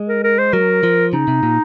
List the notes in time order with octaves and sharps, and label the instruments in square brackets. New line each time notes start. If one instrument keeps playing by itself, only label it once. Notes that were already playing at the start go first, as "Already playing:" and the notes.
Already playing: [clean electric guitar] G#3
[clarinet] A#4
A#4
C5
[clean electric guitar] F#3 [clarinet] A#4
[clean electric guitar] F3
[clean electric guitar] C#3 [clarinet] D#4
[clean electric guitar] C3
A#2